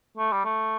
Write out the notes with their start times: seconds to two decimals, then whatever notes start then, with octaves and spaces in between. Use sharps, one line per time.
0.17 A3
0.32 G3
0.45 A3